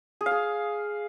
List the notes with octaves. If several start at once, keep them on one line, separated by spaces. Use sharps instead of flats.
G#4
F5
G#4